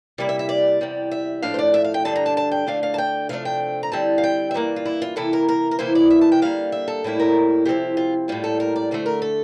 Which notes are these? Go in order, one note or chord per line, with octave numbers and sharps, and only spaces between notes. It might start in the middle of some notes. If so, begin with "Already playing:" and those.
C3 G3 A#3 E4 D5
E5
E5
D5
E2 C3 G3
E5
A2 F3 A3 D4 F5
C5
D5
E5
F5
G5
G2 D3 G3 D4 A5
A#5
A5
A5
G5
D2 D3 A3 D4 F5
F5
A5
G5
C3 F3 A3 D4 F5
G5
A#5
D3 G3 C4 E4 A5
F5
G5
E5
G2 E3 A#3 D5
F4
E4
F4
C3 E3 A#3 E4 A4
A#4
A#4
A#4
C3 E3 A#3 E4 C5
D5
E5
A5
G5
D3 G3 A#3 F5
E5
A4
A2 G3 A#3 E4
A#4
C3 F3 C4 E4 G4
F4
A2 G3 A#3 F4
A4
A#4
D5
D2 D3 A3 C5
A#4
A4